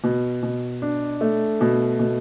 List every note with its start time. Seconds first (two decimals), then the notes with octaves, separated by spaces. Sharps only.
0.04 B2
0.43 B2
0.82 D4
1.21 A3
1.61 B2
1.99 B2